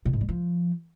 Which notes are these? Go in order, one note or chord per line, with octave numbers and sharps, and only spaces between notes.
A#2
G#2
G3
F3